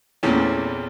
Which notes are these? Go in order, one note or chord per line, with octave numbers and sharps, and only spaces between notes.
E2 A#2 E3 A3 C4 C#4